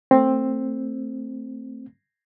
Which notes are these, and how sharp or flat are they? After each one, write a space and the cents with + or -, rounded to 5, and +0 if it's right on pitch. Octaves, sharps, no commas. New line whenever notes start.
A3 +25 C4 +10